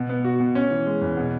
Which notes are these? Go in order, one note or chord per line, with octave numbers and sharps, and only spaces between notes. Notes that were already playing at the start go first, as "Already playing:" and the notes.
Already playing: B2
B3
F#4
B2
C#4
E3
G#3
E2
B2